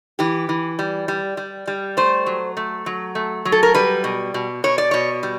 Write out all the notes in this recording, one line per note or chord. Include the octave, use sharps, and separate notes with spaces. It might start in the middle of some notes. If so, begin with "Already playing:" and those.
E3 G4
E3
G3
G3
G3
G3
A3 C5
F#3
A3
F#3
A3
F#3
A4
A#4
G3 B4
B2
B2
B2 C#5
D5
B2 C#5
G3